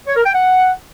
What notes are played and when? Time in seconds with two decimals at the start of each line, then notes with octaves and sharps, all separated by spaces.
0.07 C#5
0.16 A#4
0.25 G5
0.34 F#5